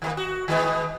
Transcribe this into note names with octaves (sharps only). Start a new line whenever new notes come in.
D#3 E3 A#3
F#4
D#3 G#3 B3